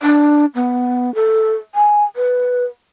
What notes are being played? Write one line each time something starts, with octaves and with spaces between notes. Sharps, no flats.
D4
B3
A4
G#5
B4